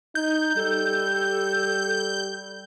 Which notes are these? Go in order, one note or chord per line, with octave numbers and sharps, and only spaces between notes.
D#4 G6
G3 A4